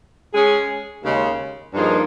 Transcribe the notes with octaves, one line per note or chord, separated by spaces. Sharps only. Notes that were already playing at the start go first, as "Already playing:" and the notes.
G#3 C#4 G#4
D#2 C#3 G#3
G2 F3 A#3 D#4 G#4